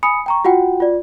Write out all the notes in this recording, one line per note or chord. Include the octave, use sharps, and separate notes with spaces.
G#5 B5 D#6 C#7
G5 A#5 C#6
F4 F#4 F#5 G5
F4 D5